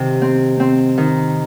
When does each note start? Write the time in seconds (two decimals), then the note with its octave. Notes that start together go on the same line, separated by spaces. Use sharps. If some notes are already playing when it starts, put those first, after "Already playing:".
Already playing: C3 D#3
0.22 C4
0.60 C4
0.98 D#3